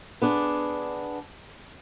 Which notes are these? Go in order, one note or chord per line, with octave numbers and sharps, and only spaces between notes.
B3 D4 G#4